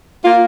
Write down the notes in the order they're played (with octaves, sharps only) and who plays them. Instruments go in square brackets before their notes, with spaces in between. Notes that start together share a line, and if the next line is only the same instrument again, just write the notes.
[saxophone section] A#3 F4